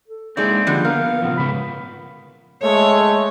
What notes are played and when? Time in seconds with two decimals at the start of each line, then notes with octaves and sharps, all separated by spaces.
0.08 A4
0.37 G#3 A#3 C4 D#4 E4 G#4 D5
0.67 D3 F3 G3 D4
0.85 B3 A#4 F5
1.22 A#2 C#3 F3 B3
1.37 G#2 C#3 B4 B5
2.62 G#3 A3 C#5